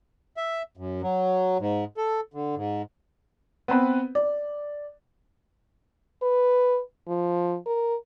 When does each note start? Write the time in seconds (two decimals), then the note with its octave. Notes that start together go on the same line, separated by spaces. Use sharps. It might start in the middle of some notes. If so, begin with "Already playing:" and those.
0.37 E5
0.77 F#2
1.02 F#3
1.60 G#2
1.97 A4
2.34 D3
2.56 G#2
3.68 B3 C4 B4
4.15 D5
6.22 B4
7.08 F3
7.66 A#4